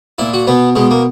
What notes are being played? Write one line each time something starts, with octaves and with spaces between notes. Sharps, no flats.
A#2 E4
F#4
B2 B3
B2 G#3
A#3